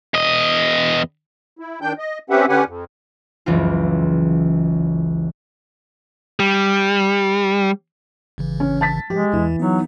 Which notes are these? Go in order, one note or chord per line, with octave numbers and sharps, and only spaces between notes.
E2 D#5
E4
D#3 D4 G5 G6
D#5
C4 C#4 G4 B4 E5 F#5
D3 C#4 G4 B4 F#5 G#5
F2
F#1 C#2 E3 F4
G3
G#1 C#3 E3
C#4
A5 A6 B6
F3 G#3 G4
E2 E3
F#3 B3 D#4